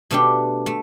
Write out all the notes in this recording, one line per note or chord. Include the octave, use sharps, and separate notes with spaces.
B2 A3 D4 G4
A3